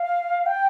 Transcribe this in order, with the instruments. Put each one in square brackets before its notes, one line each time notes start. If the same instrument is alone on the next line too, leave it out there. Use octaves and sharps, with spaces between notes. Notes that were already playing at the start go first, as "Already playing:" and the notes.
Already playing: [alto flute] F5
G5